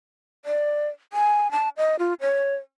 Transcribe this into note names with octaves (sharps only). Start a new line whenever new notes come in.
D5
G#5
A5
D#5
F4
C#5